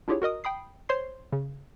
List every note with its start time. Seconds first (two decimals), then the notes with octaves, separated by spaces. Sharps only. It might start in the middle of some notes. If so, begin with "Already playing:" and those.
0.08 D4 E4 F4 G4 G#4 C#5
0.22 F#4 A#4 D#5 D#6
0.44 G5 B5 D#6 C7
0.89 C5 C#5 C6 C7
1.33 C#3